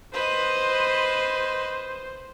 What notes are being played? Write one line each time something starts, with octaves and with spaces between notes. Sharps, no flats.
B4 C5 D#5